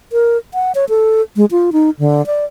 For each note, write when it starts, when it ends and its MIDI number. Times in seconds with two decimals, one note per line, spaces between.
0.12 0.37 70
0.54 0.72 78
0.75 0.85 73
0.89 1.22 69
1.36 1.45 56
1.51 1.70 65
1.72 1.90 63
1.99 2.25 50
2.26 2.45 74